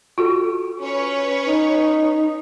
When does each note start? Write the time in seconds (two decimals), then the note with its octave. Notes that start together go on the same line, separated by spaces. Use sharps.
0.18 F4 F#4 A4
0.80 C#4 B4 C#5
1.46 D#4